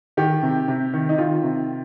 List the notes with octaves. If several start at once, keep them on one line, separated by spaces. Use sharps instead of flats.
D#3 G4
C3
C3
D#3
D#4
D#3 F4
C3